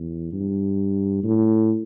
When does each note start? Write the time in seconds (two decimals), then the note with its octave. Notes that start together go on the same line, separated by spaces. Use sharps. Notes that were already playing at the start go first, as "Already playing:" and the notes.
Already playing: E2
0.33 G2
1.23 A2